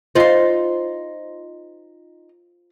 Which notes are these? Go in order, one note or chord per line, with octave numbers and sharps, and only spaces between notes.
D#4 F4 C5 C6